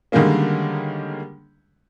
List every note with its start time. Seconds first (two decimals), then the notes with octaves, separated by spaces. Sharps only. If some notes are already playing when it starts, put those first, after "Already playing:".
0.12 D3 D#3 G3 G#3 A#3 C#4